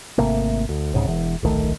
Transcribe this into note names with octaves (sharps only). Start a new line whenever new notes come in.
G#1 C3 A3 A#3
D2
C2 G#2 C#3
E1 E2
D1 A#1 D#3 A3